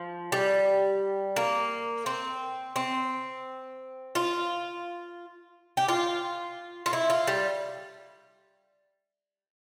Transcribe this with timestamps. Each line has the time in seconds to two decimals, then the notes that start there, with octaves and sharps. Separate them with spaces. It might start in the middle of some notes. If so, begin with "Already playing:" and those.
Already playing: F3
0.32 G3
1.36 A#3
2.06 C4
2.76 C4
4.15 F4
5.77 G4
5.88 F4
6.86 F4
6.93 E4
7.10 F4
7.27 G3